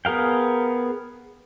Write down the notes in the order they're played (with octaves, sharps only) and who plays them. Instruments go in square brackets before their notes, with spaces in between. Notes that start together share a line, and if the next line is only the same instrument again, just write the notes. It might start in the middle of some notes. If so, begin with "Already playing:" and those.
[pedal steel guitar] B3 G#4 A#4 F5 G5